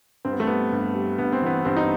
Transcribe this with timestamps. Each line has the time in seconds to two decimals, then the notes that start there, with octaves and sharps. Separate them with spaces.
0.25 G2 C4
0.32 B3
0.40 A3
0.47 G3 B3
0.72 G2
0.95 G3
1.18 G2 B3
1.32 C4
1.42 E3 B3
1.65 G2 C4
1.77 D#4